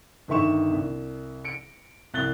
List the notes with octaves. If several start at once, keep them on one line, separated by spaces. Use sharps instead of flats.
G1 D#3 E5 C#6 E7
C2
C#7 D7
C2 F#6 A6 G7